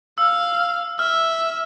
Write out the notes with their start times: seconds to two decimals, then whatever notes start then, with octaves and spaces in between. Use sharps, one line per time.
0.18 F5 E6
0.99 E5 F6